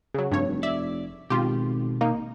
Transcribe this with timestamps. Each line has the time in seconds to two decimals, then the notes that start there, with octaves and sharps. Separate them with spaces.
0.15 C#3 F#3
0.32 F1 G2 C#5
0.63 D5 E5
1.30 G#1 B2 F4 G4
2.01 A#3 D#4